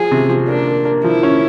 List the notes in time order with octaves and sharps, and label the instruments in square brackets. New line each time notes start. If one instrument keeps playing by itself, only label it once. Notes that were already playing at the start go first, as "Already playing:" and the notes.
Already playing: [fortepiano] F3 [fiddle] G#4
[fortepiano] C3
F3
[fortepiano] A#3 [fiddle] D4
[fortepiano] A#3
A#3
[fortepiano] F3 [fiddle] E4
[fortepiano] C#4